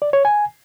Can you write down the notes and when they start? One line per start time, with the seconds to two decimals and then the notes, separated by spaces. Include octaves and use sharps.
0.02 D5
0.13 C#5
0.25 G#5